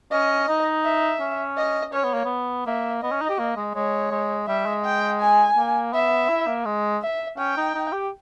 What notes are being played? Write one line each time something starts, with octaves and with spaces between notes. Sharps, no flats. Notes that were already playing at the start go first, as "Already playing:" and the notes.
C#4 D#5
D#4
E5
C#4
D#5
C#4 C#5
B3
A#3
B3
A#3 E5
B3 D#5
C#4
D#4
G4
A#3
G#3
G#3 C#5
G#3
G3 E5
G#3
G5
G#5
A#3
B3 E5
E4
A#3
G#3
E5
C#4 G5
D#4
D#4
G4